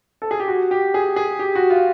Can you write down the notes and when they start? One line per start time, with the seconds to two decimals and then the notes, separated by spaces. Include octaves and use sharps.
0.22 A4
0.31 G#4
0.40 G4
0.48 F#4
0.71 G4
0.94 G#4
1.16 G#4
1.39 G4
1.55 F#4
1.70 F4